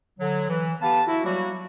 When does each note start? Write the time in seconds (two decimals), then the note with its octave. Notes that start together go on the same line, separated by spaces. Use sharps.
0.19 D3 F#3
0.49 E3
0.82 B3 G4 B4 F5 A5
1.07 E4 F#4
1.24 F#3 G3 A#3 F#4